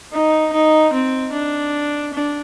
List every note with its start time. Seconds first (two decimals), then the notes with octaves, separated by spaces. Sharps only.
0.13 D#4
0.53 D#4
0.92 C4
1.32 D4
2.13 D4